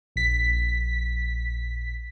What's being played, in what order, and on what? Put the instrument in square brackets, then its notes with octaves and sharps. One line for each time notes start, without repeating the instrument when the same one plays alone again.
[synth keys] A#1 B6